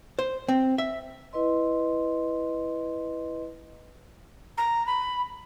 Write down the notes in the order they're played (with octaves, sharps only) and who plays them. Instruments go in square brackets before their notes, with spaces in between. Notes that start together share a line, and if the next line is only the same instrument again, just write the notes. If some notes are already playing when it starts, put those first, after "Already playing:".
[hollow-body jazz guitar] C5
C4
E5
[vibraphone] E4 B4 D#5 C6
[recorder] A#5
B5